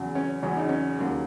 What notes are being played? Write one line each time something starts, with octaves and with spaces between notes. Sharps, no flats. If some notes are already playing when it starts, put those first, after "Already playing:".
Already playing: E2 C#3 F#3
C#4
E2 C#3 F#3 C#4
D#4
C#4
D#2 C#3 F#3